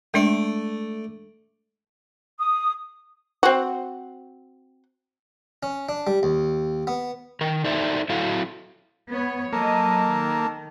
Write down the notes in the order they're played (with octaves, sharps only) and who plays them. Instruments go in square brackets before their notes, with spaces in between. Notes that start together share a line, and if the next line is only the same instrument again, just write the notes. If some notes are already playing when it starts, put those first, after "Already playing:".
[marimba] G#3 D4 E5 [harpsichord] A3 D5
[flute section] D#6
[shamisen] C4 F#4
[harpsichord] C#4
D4
G3
D#2
B3
[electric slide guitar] D#3 A#4
D#4 A4 C5 D5 E5
F#3 E4 F#4 A4 F5
[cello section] B3 C#5
[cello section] F#3 D#5 [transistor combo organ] A#3 [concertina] A4 A5
[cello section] D#3